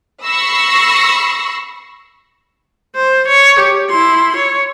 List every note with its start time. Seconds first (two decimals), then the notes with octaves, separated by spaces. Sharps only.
0.24 B5 C#6 E6 A#6 C7
2.95 C5
3.28 C#5
3.59 G4
3.90 E4 C6
4.36 C#5